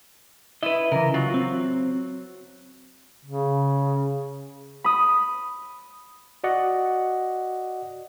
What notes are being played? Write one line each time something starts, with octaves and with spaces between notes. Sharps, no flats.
E4 B4 D#5
C#3 E3 A#4
F#3 F4
C4
C#3
B5 D#6
F#4 D5 D#5 F#5